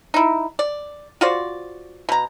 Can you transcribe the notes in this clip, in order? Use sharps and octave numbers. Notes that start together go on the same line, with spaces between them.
D#4 E4
D5
F4 F#4 C5 D5
B2 A#5